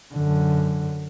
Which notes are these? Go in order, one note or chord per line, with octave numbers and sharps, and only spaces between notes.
F#2 D3